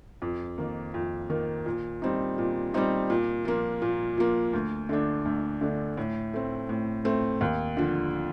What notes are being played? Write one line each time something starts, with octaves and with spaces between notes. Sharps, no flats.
F2
D#3 A#3
F2
D#3 A#3
A#2
G3 C4 D#4
A#2
G3 C4 D#4
A#2
F3 A#3
A#2
F3 A#3
D2
D3 A3 D4
D2
D3 A3 D4
A2
A3 C4
A2
A3 C4
D#2
D3 F3